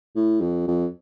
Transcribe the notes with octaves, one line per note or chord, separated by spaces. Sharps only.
A2
F2
F2